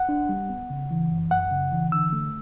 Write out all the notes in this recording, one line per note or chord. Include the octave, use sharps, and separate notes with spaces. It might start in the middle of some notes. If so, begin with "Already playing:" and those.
Already playing: F#5
D4
G3
B3
C#3
E3
F#2
F#2 F#5
C#3
E3
D3 E6
A3